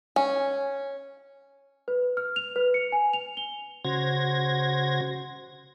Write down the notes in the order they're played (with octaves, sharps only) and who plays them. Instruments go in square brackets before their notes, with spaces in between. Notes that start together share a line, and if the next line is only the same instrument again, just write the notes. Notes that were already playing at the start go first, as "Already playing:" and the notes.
[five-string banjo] C#4
[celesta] B4
F6
F7
B4
C#7
G#5
F7
G7
[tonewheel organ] C#3 F#4 C5 G#6 A#6